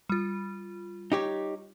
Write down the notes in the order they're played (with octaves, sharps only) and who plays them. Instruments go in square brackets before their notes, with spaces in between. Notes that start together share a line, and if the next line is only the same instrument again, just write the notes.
[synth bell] G3 F4
[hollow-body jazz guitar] D#4 G4 C#5